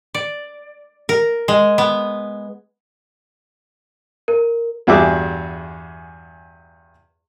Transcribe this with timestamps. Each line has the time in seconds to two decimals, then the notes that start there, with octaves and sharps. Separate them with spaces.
0.14 D5
1.09 A#4
1.48 G#3
1.78 B3
4.28 A#4
4.87 E2 G2 F#4 G#4 E5 D6